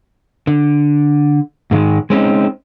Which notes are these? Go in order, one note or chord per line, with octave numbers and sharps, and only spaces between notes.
D3
G#2 D3 D#3 G#3
G#3 C4 C#4 D#4